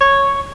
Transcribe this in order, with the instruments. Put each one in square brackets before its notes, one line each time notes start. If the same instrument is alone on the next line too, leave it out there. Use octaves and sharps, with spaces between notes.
[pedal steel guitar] C#5